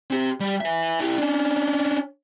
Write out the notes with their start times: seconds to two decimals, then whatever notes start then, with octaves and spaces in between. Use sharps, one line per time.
0.10 C4 G4
0.40 G3 G4
0.60 B4 E5
1.00 E4 G4
1.18 C#4 D4